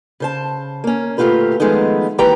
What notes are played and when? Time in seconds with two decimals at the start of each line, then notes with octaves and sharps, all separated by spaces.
0.20 C#3 C5 A5
0.84 A#3 C#4
1.18 D2 A#2 A3 F4 G4 B4
1.60 D#3 F3 G#3 A3 B3 D#4
2.18 D#2 E3 G4 B4 G5 A#5